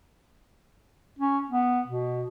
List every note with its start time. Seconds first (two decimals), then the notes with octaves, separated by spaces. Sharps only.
1.19 C#4
1.50 B3
1.87 B2